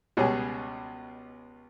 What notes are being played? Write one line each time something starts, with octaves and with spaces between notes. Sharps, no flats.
C#2 B2 G3 C#4 G#4